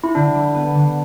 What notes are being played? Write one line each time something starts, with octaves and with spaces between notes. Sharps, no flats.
E4
D3 D4
G3
B3
D3